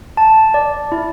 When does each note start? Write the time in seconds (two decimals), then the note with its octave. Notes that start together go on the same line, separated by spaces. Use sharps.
0.17 A5
0.54 D5
0.92 E4